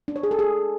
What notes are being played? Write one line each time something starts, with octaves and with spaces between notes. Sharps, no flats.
D4
C#5
G#4
A4
G#4